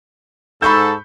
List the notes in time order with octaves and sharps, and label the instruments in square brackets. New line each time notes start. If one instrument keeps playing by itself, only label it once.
[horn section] G#2 A4 [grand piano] B5 C#6 G6